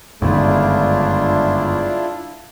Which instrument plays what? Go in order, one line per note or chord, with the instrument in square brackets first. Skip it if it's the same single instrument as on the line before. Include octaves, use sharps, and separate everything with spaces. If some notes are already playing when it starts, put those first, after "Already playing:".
[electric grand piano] G1 [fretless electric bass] F#2 D#3 A3 [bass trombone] G#3 [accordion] D4 E4 F4